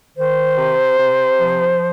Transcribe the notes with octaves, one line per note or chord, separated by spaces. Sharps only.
D#3 C5
C3
C3
F3